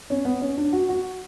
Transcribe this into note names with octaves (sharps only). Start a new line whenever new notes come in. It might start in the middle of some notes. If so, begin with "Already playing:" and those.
C#4
B3
C#4
D4
F#4
F#4